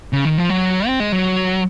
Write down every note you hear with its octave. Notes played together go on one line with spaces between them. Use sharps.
C#3
D#3
F3
F#3
C4
G#3
F#3